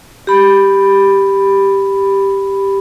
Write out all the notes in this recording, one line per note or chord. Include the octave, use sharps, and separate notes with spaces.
G4 B5